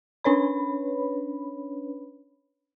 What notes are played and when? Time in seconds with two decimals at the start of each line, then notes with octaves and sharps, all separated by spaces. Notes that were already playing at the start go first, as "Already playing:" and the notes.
0.24 C#4 D4 B4 C#5 B5